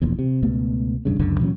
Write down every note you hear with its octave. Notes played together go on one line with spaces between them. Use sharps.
E1 A#1 E2
C3
C#2 B2 A3 B3
E1 G2 C#3
F#1 C#2 F#2 D3
A#2 E3 F#3 C#4